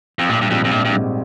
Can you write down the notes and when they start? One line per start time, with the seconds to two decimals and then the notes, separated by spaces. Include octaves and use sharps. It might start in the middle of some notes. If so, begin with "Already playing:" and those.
0.19 F2
0.29 A#1 G2
0.41 G2
0.50 F2 G#2 G3 C4
0.64 F2
0.71 A#1 G2
0.85 G2
0.92 G#2 G3 C4